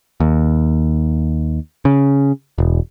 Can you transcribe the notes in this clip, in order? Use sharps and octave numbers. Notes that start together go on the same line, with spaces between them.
D#2
C#3
E1